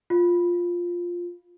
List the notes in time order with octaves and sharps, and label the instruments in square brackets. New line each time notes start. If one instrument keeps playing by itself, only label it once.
[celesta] F4